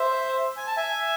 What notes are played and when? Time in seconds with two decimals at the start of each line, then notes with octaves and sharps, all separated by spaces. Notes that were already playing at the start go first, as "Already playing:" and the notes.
Already playing: C5 E5
0.57 G#5
0.67 A5
0.76 E5 G#5